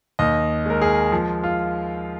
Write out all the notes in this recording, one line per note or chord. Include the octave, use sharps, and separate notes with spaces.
D#2 D#5
G#3 A#4
G#4
F3
F4